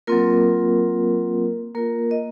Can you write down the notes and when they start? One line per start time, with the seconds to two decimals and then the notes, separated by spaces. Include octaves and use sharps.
0.07 F#3 A#3 C4 F4 A#4
1.75 A#3 F4 A#4
2.11 D#5